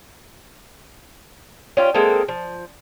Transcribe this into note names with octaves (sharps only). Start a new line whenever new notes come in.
C#4 F4 G4
G#3 A#3 C4 A4
F3